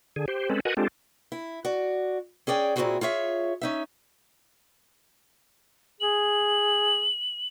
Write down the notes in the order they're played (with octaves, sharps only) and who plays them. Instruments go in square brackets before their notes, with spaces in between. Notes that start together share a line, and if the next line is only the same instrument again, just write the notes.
[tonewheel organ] D3 G#4
G4 C5
G#3 C4 C#4 A4 B4
F#4 A#4 B4 D#5 F#5 G#5
G#3 C4 D4 F4 G4 A4
[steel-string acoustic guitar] E4
F#4 D5
C#4 G#4 D5 G5
A#2 C4 D4 E4 F#4 G#4
F4 G#4 C#5 E5
C#4 D#4 E5
[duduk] G#4 [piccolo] F#7